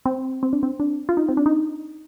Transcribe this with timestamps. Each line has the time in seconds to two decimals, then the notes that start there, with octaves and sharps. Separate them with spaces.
0.05 C4
0.43 C4
0.53 D4
0.63 C4
0.80 D4
1.09 F4
1.17 D#4
1.29 C4
1.37 D4
1.46 D#4